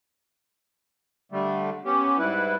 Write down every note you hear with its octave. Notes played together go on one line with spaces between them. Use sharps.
D3 G3 A3
B3 C#4 G4
G#2 G3 E4 B4